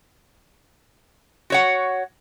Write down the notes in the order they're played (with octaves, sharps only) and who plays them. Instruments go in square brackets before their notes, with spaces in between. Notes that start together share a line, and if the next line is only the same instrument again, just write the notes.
[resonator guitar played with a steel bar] F#4 C#5 F#5